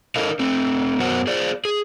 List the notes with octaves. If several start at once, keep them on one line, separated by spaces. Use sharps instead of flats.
D#4 A4 A#4 D#5 F5
A3 C4
F#2 B3 F#4 A#4 C5 F#5
G#4 C5 D5
G#4